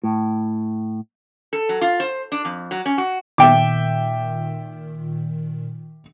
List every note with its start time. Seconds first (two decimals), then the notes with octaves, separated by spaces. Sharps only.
0.03 A2
1.53 A4
1.69 F#3
1.81 F4
2.00 C5
2.32 D4
2.45 F2
2.71 F#3
2.86 C#4
2.98 F#4
3.38 A#2 D#3 E5 G5 D6